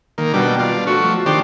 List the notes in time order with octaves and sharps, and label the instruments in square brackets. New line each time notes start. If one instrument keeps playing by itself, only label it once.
[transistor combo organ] D#3 A#3
[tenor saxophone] B2 [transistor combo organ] G3 D4
[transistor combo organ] D4 F4
[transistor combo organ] F3 A3 [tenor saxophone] F#4
[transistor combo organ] D#3 D4 C5 [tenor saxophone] G4